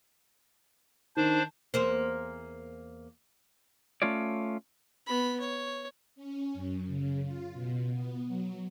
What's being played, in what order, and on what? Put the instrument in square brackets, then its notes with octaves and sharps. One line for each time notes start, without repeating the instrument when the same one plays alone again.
[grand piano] D#3 [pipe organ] D4 C5
[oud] E2 A#3 C5
[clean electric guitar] A3 C#4 F4 C#5 D5
[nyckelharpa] B3 B5
C#5
[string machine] C#4
F#2
C#3
F4
B2
B3
F#3